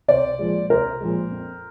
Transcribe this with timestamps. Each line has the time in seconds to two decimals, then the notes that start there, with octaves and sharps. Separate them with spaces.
0.08 C2 C5 D5
0.39 A#2 F3 G#3
0.70 C2 A#4 C5
1.00 A#2 F3 G#3
1.32 F2